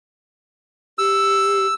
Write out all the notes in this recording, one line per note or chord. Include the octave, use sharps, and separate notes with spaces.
G4 E6